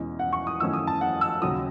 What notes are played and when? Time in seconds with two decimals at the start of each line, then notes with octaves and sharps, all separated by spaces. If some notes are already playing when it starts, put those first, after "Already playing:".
Already playing: E2 B2 G#3 C#4
0.19 F#5
0.33 C#6
0.47 D#6
0.60 F#2 D#3 A3 C#4 E4 E6
0.74 D#6
0.87 A5
1.01 F#5
1.21 E6
1.42 D#2 C#3 F#3 D#6